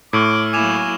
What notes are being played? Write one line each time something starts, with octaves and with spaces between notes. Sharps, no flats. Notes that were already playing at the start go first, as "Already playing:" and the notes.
A2 C#6 D6 E6 F6
F#3 A#3 E4 G#5 D6 E7 F7